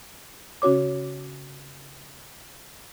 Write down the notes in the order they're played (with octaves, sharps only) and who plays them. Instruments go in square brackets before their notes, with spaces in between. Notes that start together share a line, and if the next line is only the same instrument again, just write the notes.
[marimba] C#3 C#4 F#4 C#5 D6